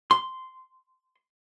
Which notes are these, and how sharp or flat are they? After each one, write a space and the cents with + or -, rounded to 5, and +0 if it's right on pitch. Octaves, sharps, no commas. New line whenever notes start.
C6 -10